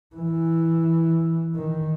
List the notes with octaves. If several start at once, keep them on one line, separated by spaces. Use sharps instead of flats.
E3
D#3